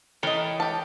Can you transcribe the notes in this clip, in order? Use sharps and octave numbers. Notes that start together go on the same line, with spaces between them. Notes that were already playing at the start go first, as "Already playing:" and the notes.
E3 A4 A#4 C#5 D#5 G5
G4 A5